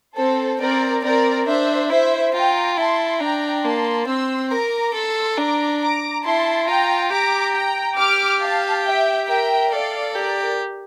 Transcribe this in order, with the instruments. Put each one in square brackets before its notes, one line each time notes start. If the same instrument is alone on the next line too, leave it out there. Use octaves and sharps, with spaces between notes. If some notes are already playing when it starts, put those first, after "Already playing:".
[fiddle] C4 [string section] A4 C5
[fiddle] C4 [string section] A#4 D5
[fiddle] C4 [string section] A#4 D5
[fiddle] D4 [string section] C5 E5
[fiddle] E4 [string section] C5 E5
[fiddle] F4 [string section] G5 A#5
[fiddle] E4 [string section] A5 C6
[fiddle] D4 [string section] G5 A#5
[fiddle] A#3 [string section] A5 C6
[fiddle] C4 [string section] C6 E6
[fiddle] A#4 [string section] A#5 D6
[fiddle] A4 [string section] C6 E6
[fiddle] D4 [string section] A#5 D6
[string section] A#5 D6
[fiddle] E4 [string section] A5 C6
[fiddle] F4 [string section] G5 A#5
[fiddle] G4 [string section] A#5 D6
[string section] G5 A#5
[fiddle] G4 [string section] D6 F6
[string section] F5 A5
E5 G5
[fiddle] A#4 [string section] E5 G5
[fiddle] A4 [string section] D5 F5
[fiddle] G4 [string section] A#4 D5